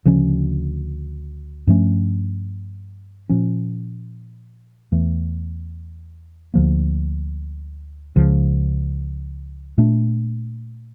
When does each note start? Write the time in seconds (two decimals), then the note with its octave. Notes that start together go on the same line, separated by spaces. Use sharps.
0.05 D2 C#3 F3 C#4
1.67 G2 F3 A3 C#4
3.29 A#2 F3 C#4
4.92 E2 E3 A3
6.54 D2 D3 F3 A#3
8.16 C#2 C#3 F3
9.78 A#2 A3 D4